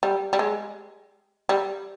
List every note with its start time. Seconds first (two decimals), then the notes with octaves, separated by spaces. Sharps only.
0.03 G3
0.33 G3
0.39 G#3
1.49 G3